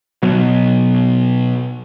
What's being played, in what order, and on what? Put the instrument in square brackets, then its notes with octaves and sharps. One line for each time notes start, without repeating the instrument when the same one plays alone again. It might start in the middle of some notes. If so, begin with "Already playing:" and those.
[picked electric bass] B2 F#3